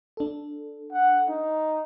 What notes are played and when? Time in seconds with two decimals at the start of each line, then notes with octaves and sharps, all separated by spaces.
0.17 D4 A4
0.93 F#5
1.29 D#4